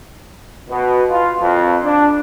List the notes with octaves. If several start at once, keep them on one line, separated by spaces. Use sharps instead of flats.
B2
F4
F2
D4